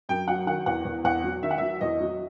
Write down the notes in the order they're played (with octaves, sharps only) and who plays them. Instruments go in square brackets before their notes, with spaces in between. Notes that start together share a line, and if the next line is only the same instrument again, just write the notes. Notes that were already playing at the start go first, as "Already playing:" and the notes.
[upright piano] F#2 G5
F#3 F#5
D#3 F#5
E2 F#5
E2
E2 F#5
F#3
D#3 E5
F#5
F#3 E5
E2 D#5
F#3